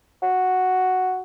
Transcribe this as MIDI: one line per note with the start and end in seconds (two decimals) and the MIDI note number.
0.22 1.23 66